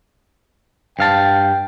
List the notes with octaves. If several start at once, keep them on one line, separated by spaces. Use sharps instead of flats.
G2 F5 G5 A5